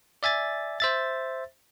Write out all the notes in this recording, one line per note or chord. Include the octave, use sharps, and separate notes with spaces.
D5 E5 G#5 A6
C5 E5 A6